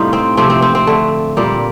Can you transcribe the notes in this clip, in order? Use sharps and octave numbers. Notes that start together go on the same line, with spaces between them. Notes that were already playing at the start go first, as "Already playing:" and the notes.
Already playing: A2 C3 G3 D#4 F4
C4
C3 F3 A3 C4
C4
C4
C4
D3 A3
A#2 G3 A#3